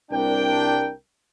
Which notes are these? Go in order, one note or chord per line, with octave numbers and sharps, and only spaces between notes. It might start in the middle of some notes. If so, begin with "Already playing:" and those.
C2 D4 A#4 G5